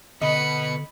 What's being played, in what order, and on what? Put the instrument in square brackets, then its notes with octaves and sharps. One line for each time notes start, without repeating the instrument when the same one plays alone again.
[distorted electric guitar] B2 B4 [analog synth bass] D3 [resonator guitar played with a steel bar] D#5 [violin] B5 C#7